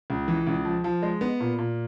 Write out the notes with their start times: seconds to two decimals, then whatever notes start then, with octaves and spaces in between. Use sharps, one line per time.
0.10 C#2
0.28 E3
0.47 C#2
0.65 F3
0.84 F3
1.02 G#3
1.21 B3
1.40 A#2
1.58 A#2